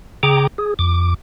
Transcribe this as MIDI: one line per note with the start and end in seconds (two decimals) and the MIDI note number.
0.23 0.47 49
0.23 0.47 68
0.23 0.47 79
0.23 0.47 82
0.23 0.47 86
0.58 0.74 68
0.79 1.14 41
0.79 1.14 86